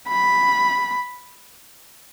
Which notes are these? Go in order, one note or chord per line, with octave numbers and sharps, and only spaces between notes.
B5